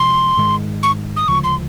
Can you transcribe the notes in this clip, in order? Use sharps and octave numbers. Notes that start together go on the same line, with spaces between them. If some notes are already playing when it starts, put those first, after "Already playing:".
Already playing: C3 F3 G#3 C6
G#2 D#3 G#3
C#6
D#6
D2 C#3 F3 G#3 C#6
C6